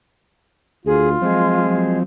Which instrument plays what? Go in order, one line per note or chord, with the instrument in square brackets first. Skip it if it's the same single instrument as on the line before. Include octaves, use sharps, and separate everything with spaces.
[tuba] D2 [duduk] F4 [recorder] G#4
[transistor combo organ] F3 C4 [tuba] F#3 [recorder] G#3
[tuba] F#3